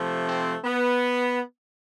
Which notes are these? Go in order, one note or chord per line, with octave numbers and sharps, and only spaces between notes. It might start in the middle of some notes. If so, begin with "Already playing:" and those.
Already playing: C3 F3 A3
C4
B3